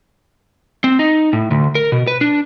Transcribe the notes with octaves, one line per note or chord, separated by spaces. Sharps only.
C4
D#4
A2
D2
A#4
B2
B4
D4